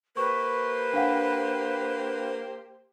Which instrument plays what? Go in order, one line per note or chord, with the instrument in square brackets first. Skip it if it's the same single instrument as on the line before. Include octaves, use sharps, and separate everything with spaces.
[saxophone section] A#3 G4 C5 [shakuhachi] B4 [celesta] C#6
[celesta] D4 F5 F#5